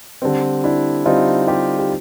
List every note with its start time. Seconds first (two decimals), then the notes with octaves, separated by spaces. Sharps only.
0.22 D3 G3 C4
0.64 D4 E4
1.05 D3 G3 C4 D#4 F4
1.48 F4 G4
1.79 G4